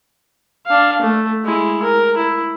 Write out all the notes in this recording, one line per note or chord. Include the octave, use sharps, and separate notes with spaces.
D4 F5
A3
G#3 E4
A#4
E4